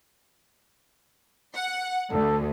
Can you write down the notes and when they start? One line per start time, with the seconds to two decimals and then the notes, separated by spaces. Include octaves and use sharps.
1.56 F#5
2.12 D2 A4